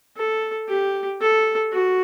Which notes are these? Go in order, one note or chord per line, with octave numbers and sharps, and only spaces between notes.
A4
G4
A4
F#4